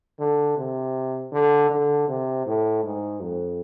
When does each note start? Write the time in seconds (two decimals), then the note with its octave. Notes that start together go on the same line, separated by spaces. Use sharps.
0.19 D3
0.57 C3
1.32 D3
1.70 D3
2.08 C3
2.46 A2
2.84 G#2
3.21 F2